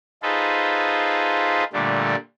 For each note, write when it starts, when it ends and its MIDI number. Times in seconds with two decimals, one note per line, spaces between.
0.23 1.64 63
0.23 1.64 65
0.23 1.64 68
0.23 1.64 69
0.23 1.64 71
0.23 1.64 72
1.73 2.15 46
1.73 2.15 50
1.73 2.15 55
1.73 2.15 57
1.73 2.15 62